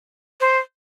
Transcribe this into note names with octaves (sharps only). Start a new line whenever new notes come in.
C5